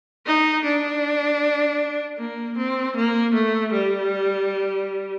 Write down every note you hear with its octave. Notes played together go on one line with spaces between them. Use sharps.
D#4
D4
A#3
C4
A#3
A3
G3